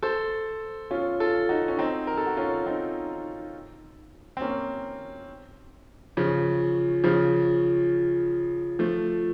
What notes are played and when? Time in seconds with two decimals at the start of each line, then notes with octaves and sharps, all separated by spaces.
0.03 A4 C5
0.91 C#4 F4
1.20 F4 A4
1.49 D#4 F#4
1.68 C#4
1.78 C4 D#4
2.07 A#4
2.17 A4
2.27 F#4
2.37 C#4 F4
2.66 C4 D#4
4.37 C4
4.41 A#3 C#4
6.17 C#3 F3
7.04 C#3 F3
8.79 F3 A3